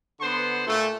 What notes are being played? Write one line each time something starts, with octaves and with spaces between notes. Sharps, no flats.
D3 B3 C5 F#5 C6
A#2 A3